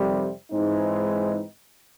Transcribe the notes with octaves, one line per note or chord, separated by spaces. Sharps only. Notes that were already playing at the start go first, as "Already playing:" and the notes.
Already playing: F2 C3 D#3 G3
G#2 E3 G#3 C4 D#4